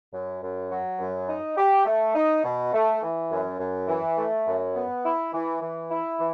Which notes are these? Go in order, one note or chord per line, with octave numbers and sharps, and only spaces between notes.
F#2
F#2
F#3
F#2
D#4
G4
A3
D#4
B2
A3
E3
F#2
F#2
E3
A3
F#2
B3
E4
E3
E3
E4
E3